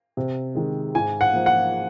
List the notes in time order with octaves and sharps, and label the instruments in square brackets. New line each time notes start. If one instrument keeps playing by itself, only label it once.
[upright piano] C3
D#3 G#3
G#2 G#5
F#5
F3 A#3
F#5